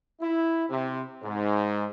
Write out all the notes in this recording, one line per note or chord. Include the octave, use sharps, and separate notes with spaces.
E4
C3
G#2